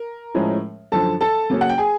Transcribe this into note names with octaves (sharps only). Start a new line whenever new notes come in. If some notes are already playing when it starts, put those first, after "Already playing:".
Already playing: A#4
A2 F3 G#3 C#4
F#2 D3 F3 A4 A5
A4 A5
C#3 F#3 A#3 C#4
F#5
G5
G#4 G#5